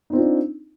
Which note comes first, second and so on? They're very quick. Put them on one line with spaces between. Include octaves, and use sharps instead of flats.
D#4 C4 F4 D4